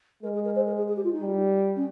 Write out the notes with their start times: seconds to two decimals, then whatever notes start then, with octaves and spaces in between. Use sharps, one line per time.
0.23 G#3 A#4
0.34 G#4
0.44 A#4
0.55 C5
0.66 A#4
0.77 G#4
0.88 G#4
0.96 G4
1.04 F4
1.12 D#4
1.20 G3
1.76 C#4